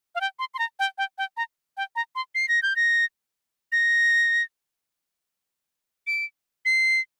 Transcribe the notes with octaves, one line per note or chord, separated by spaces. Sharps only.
F5
G5
C6
C6
A#5
G5
G5
G5
A#5
G5
A#5
C6
C7
A#6
G6
A#6
A#6
D7
C7